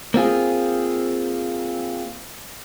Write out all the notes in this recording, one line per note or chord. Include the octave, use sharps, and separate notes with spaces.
A#3 C4 F4 G#4